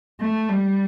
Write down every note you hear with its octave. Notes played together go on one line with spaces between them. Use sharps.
A3
G3